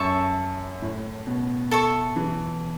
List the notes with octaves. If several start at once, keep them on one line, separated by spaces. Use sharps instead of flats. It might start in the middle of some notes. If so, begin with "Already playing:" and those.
Already playing: F#2 A4 E5 A5 C#6
A2
B2
A4 E5 C#6
E3